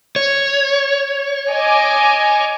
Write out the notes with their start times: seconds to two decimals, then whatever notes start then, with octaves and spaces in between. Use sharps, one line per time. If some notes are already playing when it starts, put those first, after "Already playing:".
0.16 C#5
1.51 D#5 G#5 D6